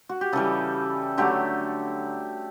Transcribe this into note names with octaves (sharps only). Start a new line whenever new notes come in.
F#4
G4
C#3 E3 G3 A4
D3 F#3 A3 G4